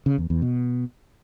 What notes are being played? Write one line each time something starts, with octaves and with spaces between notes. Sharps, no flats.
C#3
E2
E2
B2